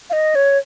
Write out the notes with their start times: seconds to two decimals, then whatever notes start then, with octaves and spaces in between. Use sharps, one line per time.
0.10 F5
0.13 D#5
0.35 C#5